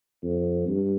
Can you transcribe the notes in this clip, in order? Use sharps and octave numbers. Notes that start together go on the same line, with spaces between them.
F2
G2